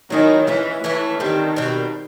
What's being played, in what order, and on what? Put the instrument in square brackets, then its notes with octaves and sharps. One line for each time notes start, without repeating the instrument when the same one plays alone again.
[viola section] D#3 [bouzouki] F#3 A#3 C#4 E4
[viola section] E3 [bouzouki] G#3 C#4 F4
[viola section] E3 [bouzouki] A3 C#4 E4
[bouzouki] D3 G3 C4 [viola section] D#3
[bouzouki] B2 G3 C4